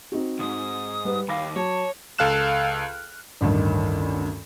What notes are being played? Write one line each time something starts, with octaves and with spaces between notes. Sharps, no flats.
C4 D#4 F#4
C#2 G#2 D#6
G3 B4
D#2 F5 B5 D6 A#6
F#3 C#5 A5
C#2 A4 F5 F6 F#6 E7
A1 D2 G2 D#3